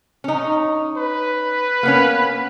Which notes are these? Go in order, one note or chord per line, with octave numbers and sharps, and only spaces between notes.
C#4 D#4
B4
A#3 B3 C#4